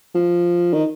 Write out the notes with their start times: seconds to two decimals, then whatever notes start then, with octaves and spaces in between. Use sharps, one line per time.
0.15 F3
0.74 D#3